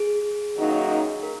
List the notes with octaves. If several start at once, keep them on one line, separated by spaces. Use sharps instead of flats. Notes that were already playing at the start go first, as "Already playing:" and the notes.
Already playing: G#4
F#2 D#3 F#3 A#3 D#4
A#4